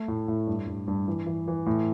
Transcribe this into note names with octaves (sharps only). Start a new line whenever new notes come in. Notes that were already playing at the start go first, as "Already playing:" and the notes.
Already playing: A3
A2
A2
G2
G2
G2
E3
E3
E3
A2